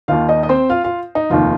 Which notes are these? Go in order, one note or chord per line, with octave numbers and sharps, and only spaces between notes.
D#2 D#3 F4 F5
D#4 D#5
D#5
C4 C5
F4 F5
F4 F5
D#4
F1 D#2 D#3 F4